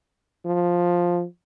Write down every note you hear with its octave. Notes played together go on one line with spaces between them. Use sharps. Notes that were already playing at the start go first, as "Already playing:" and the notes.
F3